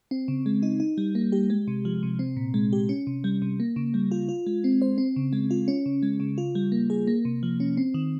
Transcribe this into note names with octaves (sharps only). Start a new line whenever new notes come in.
C4
C#3
G#3
D#4
D#4
G3
A#3
G4
G#3
C3
F3
C3
C4
A#2
G#3
G4
C#4
C3
G3
C3
A#3
C#3
G3
F4
F4
G#3
C4
C5
C4
C#3
G#3
F4
C#4
C#3
G#3
C#3
F4
G3
A#3
G#4
A#3
C3
F3
C#4
C4
D#3